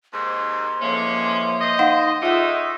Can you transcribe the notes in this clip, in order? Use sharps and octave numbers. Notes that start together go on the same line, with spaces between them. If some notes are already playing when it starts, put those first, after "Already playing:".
D#2 G#2 C3 C6
D3 E3 F3 G#3 A#3 C#4
C5 D#5
D#4 F5 F#5
G#3 A3 C#4 D#4 F4 D#5 E5 F#5